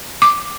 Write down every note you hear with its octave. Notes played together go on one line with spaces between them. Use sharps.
D6